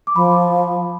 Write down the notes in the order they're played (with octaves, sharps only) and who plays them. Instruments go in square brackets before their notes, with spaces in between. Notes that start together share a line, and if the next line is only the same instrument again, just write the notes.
[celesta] D6
[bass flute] F3 [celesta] B5